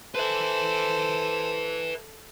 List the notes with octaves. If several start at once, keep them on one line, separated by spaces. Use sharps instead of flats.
A4 B4 C5 E5